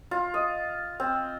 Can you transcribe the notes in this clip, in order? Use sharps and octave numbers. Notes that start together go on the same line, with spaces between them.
F4
D#5
C4